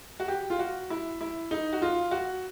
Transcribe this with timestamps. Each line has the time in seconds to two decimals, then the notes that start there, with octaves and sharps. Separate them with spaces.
0.20 F#4
0.28 G4
0.50 F4
0.59 F#4
0.90 E4
1.21 E4
1.51 D#4
1.73 F#4
1.82 F4
2.11 F#4